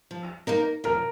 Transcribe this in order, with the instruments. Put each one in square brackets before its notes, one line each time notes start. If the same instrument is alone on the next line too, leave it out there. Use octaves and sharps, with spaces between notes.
[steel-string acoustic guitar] F3
A#3 D#4 A#4
[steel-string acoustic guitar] F3 [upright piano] A#4